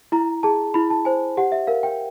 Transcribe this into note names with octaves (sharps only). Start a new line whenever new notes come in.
E4 A#5
G#4 A5
E4 B5
A5
C5 G#5
G4 F#5
E5
A#4 F5
G5